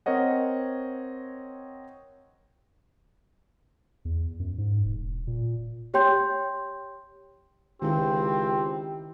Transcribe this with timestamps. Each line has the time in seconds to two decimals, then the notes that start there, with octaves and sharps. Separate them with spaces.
0.06 C4 A#4 C#5 D#5 F#5
4.05 E2
4.40 F#2
4.58 G#2
4.85 E1
5.27 A#2
5.94 G4 C#5 G5 C6 G6
7.82 C#2 D#3 C4 E4 G4